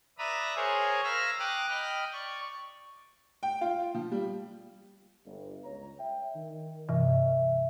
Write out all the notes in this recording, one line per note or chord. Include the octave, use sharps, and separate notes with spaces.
B4 D5 E5 A#5 B5 D#6
G#4 A#4 C5 C#5 G#5
F5 A#5 B5 E6 F6 A#6
G5 A#5 D6 D#6 F#6
D#5 G5 B5 F6
D5 C#6
G5
F4
F3
G3
G1
C#2 C#5 A#5
E5 G5
D#3
G2 C3 E3 E5